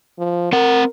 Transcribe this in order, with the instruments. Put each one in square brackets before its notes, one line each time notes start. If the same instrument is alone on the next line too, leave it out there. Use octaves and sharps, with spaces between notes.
[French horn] F3
[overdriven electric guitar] C4 F#5 [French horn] A#4